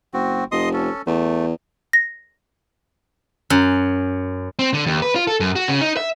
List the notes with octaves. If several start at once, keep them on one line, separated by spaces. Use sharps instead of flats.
F#1 C4 F#4
F1 D#5 C6 D#6
C#4 A4
E2 A3
A#6
F#2
C4
D3
D#2
B4
F4
A4
F#2
F#4
C#3
D#4
E5